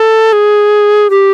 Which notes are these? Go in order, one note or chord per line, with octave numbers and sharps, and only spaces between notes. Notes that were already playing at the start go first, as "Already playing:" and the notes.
Already playing: A4
G#4
G4